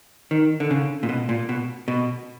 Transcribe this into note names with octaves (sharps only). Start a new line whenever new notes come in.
D#3
D3
C#3
A#2
B2
A#2
B2
B2